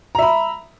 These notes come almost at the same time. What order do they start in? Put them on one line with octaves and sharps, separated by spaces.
A#5 E5 B5